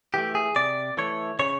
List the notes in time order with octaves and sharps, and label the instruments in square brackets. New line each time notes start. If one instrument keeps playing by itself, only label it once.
[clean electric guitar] E3 A3 G4
G#4
C3 D5
E3 A3 C#5
C#3 C#5